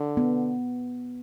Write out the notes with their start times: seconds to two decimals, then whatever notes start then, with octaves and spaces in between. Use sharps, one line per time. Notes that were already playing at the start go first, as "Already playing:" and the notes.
Already playing: D3
0.17 B3